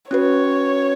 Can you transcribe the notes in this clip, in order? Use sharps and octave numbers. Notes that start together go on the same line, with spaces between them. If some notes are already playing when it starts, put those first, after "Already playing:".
C#4 F#4 B4 C#5